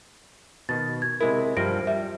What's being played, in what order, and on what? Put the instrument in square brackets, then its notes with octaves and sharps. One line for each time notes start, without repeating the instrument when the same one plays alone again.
[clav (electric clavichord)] B2 D#3 [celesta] A6
[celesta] G#6
[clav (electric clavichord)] C3 G#3 E4 [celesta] A#4
[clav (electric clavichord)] G2 F3 G3 [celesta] A#6 D7
[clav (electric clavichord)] G3 [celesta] E5